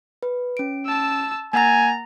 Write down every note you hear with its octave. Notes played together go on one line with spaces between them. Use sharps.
B4
C#4 D7
A5 E6
A#3 F#5 G#5 A#5 A6